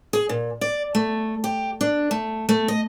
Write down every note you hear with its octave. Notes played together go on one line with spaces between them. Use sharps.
G#4
A#2
D5
A3
G4
D4
A3
A3
D#5